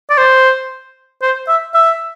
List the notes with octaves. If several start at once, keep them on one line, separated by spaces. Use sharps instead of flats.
D5
C5
C5
E5
E5